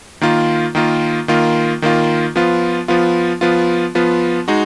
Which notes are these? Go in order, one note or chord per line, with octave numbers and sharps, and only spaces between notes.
D#3 A#3 F4
D#3 A#3 F4
D#3 A#3 F4
D#3 A#3 F4
F3 B3 F4
F3 B3 F4
F3 B3 F4
F3 B3 F4
G#3 D#4 F#4